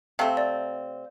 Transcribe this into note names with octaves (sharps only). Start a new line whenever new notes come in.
C3 A3 C4 F5
D5